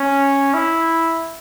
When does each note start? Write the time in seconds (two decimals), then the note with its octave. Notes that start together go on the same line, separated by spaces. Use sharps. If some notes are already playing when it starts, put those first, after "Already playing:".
Already playing: C#4
0.54 E4